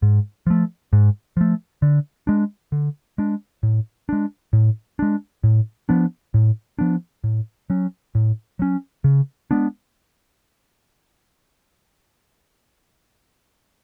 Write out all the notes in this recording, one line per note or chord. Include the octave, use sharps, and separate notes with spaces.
G#2
F3 A3
G#2
F3 A3
D3
G#3 D4
D3
G#3 D4
A2
G#3 D4
A2
G#3 D4
A2
F3 B3 D4
A2
F3 B3 D4
A2
F#3 C#4
A2
F#3 C#4
C#3
G#3 B3 D4